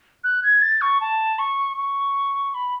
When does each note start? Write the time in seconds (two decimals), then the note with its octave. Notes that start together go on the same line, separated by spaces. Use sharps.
0.24 F#6
0.43 G#6
0.62 A6
0.81 C#6
1.01 A5
1.39 C#6
1.77 C#6
2.54 B5